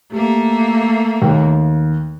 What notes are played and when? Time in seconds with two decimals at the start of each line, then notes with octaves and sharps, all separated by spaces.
0.12 A3 A#3 G4
1.22 D#2